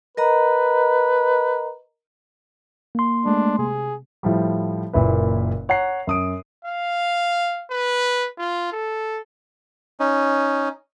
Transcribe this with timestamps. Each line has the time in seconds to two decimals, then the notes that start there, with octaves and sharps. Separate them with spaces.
0.17 A#4 B4 D#5 A#5
2.95 A#3 C6
3.26 G#3 A3 D4
3.59 C3 G#4
4.23 A2 F3 G3
4.93 F#1 A#2 E4 B4
5.69 C#5 F#5 A#5 C7
6.07 F#2 D#6 D7
6.65 F5
7.71 B4
8.38 F4
8.72 A4
10.00 C#4 D#4